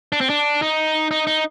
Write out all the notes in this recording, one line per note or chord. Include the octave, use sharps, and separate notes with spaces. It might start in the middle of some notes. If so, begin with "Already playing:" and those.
D4
C4
D4
D#4
D#4
D#4